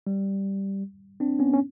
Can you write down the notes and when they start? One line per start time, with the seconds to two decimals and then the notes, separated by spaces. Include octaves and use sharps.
0.07 G3
1.20 C4 D4
1.39 B3 C#4
1.53 C#4